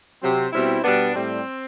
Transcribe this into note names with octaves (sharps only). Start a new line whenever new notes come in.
C3 F#3 C4
B2 G3 C4 E4
B2 G3 B3 D4
A2 G3 C4